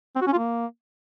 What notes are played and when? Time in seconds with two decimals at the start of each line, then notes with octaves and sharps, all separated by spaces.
0.16 C4
0.21 F#4
0.27 C#4
0.33 F4
0.38 A#3